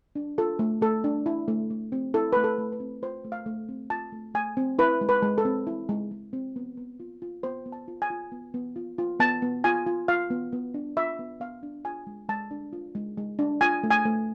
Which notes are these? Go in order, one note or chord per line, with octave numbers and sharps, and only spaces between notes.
D4
F4 A4
A3
A3 A4
D4
E4
A3
A3
C4
E4 A4
A3 B4
A4
A3
B4
C4
F4 C5
A3
F5
A3
C4
F4 A5
A3
A3 G#5
C4
E4 B4
G#3
B4
G#3
A4
C4
E4
G#3
G#3
C4
B3
B3
F4
F4
B3 C5
B3
A5
F4
G#5
F4
B3
B3
F4
F4
B3 A5
B3
F4 G#5
F4
F4 F5
B3
B3
D4
F4 E5
B3
B3 F5
D4
F4 G#5
G#3
G#3 A5
D4
F4
G#3
G#3
D4
F4 G#5
A3
G#5
A3